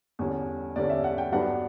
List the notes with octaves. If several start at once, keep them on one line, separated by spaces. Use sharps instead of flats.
E2 D3 G3 C#4
E2 D3 G3 C#4 D5
E5
F#5
G5
G2 F#3 B3 D4 F#5